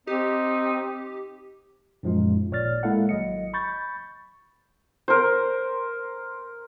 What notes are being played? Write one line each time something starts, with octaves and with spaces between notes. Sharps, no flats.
C4 D#4 G4
F#2 A#2 F3 G#3 D#4 F4
G#1 A#2 C#5 D5 F6 A6
G#3 A#3 E4 A4 F5 F#5
G#1 F#3 D#5 C#7
B5 C#6 G6 A6
A#4 C5